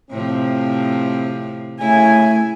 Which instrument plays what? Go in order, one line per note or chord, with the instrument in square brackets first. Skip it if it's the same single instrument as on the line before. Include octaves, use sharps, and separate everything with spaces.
[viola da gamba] A2 C3 F3 [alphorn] C4
[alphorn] C#3 [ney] A3 [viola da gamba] E4 [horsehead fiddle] G#5